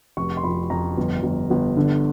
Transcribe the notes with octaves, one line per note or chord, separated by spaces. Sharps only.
F1 C#6
C6
F2 B5
F2 A#5
G1
G1
G1
D3